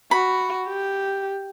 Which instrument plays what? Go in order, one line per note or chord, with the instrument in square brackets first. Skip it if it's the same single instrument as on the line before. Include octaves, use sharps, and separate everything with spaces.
[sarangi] F#4 [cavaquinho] B5
[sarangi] G4